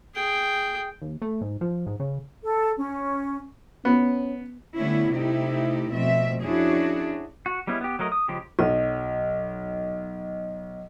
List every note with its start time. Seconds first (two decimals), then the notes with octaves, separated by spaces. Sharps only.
0.15 G#4 G5
1.02 D#2
1.22 A3
1.41 G#2
1.61 F3
1.87 G#2
2.00 C#3
2.43 A4
2.77 C#4
3.85 B3 C#4
4.76 D3 G3 A3 B3 C#4 E4
5.13 C3 A3 D#4 E4 G4
5.91 B2 F3 A3 C4 E5
6.42 F2 C#4 D4 E4 F#4 G#4
7.46 F#4
7.67 G3 G#3 B3 C#4 E4
7.81 B3 G4
7.99 F#3 A3 A#4 D#5
8.12 D#6
8.28 C#3 F3 G#3 G4
8.59 B1 D#5